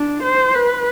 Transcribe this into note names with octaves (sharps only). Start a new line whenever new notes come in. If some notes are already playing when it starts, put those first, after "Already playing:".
Already playing: D4
C5
B4